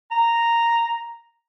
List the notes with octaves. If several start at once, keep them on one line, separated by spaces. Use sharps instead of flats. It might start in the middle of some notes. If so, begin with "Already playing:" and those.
A#5